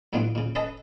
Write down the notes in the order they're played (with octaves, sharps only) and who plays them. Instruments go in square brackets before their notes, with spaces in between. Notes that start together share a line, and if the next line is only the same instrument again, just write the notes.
[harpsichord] A2 A3 B3 D4 F4 G4
A#2 C#3
C#4 A4 B4 D#5 A5 A#5